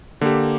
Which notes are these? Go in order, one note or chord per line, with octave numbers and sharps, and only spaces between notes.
D3 A#3 G4